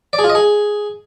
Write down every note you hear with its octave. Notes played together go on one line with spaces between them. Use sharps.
D5
G#4
F4
D#5
G#4